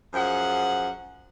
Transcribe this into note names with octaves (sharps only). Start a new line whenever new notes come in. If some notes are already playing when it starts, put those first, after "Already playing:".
F#2 F3 G#4 F#5